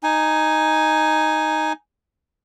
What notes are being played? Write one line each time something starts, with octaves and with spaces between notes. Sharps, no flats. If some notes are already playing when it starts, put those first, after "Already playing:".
D#4 G#5